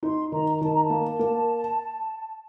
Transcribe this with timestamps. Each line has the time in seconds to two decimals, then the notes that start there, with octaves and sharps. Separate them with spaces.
0.03 D#4 C6
0.32 D#3 A#5
0.61 D#3 A5
0.73 A#5
0.84 A5
0.90 A#3
1.19 A#3